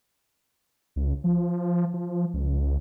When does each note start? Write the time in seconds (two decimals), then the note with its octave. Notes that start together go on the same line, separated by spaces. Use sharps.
0.96 C#2
1.24 F3
1.94 F3
2.34 C#2